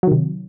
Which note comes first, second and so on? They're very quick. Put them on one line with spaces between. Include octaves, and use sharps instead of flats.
F#3 D#3 C3